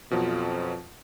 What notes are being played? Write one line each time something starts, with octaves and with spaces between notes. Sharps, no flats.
F2 B2 F3 F#3